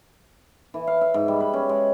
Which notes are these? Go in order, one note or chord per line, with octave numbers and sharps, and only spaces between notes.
E3
F5
E5
G#2
G3
B4
C#4
G#3